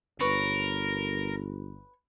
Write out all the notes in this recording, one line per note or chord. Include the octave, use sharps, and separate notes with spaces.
G1 A#4 B4 C#5